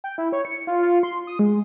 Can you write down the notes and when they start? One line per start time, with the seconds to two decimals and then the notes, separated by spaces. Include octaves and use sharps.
0.04 G5
0.18 E4
0.32 C#5
0.45 C#7
0.67 F4
0.83 F4
1.03 C6
1.27 D#6
1.39 G#3